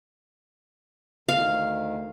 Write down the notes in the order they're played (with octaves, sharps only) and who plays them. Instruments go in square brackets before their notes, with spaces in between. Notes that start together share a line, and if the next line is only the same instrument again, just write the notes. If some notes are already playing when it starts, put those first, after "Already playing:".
[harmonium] D2 D#3 [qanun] F5